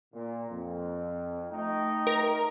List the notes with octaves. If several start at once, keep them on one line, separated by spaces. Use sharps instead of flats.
A#2
F2
A3 D#4 G5
A#4